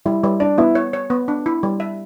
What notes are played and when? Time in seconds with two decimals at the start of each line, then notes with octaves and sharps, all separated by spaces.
0.05 G3 E4
0.24 G3
0.40 D4 D5
0.58 B3 E4
0.75 C#5
0.93 C#5
1.10 B3
1.28 D4
1.46 E4
1.63 G3
1.80 E5